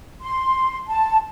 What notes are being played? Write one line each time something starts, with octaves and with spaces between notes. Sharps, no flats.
C6
A5